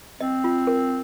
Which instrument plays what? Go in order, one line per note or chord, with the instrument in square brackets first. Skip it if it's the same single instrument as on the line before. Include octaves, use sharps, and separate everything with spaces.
[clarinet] C4 [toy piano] D#5
[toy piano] F4
A#4